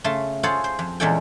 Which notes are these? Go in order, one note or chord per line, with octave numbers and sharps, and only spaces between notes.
C#3 A3 A5 C6
F4 G#4 A4 C5 C#5 F#5
C5
F2
E2 A#2 G#3 C#4 A4 G5